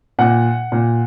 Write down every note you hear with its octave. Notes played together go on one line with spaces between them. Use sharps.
A#2 F#5
A#2